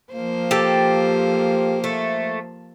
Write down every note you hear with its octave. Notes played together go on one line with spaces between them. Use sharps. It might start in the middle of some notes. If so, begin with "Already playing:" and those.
F3 A#3 C5
G4 A4
A3